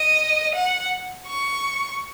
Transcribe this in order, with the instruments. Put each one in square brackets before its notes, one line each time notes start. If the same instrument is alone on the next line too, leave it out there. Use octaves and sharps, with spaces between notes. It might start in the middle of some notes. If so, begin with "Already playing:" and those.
Already playing: [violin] D#5
F#5
C#6